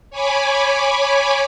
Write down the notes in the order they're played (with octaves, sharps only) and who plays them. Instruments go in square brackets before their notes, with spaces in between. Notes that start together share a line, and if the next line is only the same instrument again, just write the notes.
[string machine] C#5 G#5 B5 D6